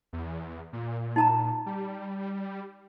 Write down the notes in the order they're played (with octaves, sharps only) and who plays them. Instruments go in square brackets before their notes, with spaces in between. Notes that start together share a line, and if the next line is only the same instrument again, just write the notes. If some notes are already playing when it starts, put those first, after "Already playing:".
[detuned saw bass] E2
A#2
[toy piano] D#4 A5 A#5
[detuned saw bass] G3